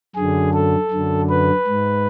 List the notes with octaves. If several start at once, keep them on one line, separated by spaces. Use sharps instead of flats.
F#2 D3 G#4
A4
F#2 D3
B4
G#2